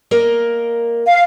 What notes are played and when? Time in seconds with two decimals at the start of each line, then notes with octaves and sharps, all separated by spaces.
0.11 A#3 A#4 D#5
1.07 F5